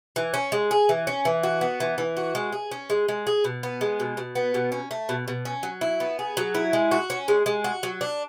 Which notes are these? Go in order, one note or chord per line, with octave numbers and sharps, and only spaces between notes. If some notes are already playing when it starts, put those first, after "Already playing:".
E3
C#4
G#3
G#4
E3
C#4
E3
F#4
B3
E3
E3
F#4
G#3
G#4
C#4
G#3
G#3
G#4
B2
B3
G#3
B2
B2
B3
B2
C#4
A3
B2
B2
C#4
F#3
E4
B3
G#4
F#3
E4
G#3
F#4
C#4
G#3
G#3
F#4
F#3
D4